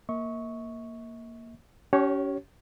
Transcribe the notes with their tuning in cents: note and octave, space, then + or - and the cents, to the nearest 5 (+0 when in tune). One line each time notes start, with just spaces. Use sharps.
A#3 +0 E5 -45 C#6 +0
C#4 +30 G4 -35 C#5 -5